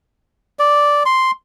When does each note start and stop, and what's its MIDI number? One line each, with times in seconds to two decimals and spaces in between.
0.59 1.03 74
1.05 1.31 84